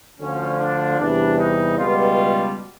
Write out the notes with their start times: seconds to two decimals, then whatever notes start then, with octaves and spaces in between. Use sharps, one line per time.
0.19 D2 D3 F3 C#4
0.59 D4
0.99 E2 C3 E3 G3 D4
1.38 D#4
1.78 C#2 B2 G3 F4